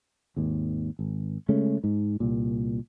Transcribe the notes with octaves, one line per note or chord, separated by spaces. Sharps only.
G#1 D#2
G#1
C#3 G#3 A3 C#4
G#2
C2 A#2